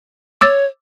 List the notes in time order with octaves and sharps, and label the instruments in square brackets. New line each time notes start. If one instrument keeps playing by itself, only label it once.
[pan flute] C#5 [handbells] D6 E6 A6